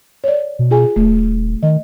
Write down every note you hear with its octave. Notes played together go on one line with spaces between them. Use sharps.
C#5 D5
B2
F4 G#4 G#5
D#1 A3
D#3 D#5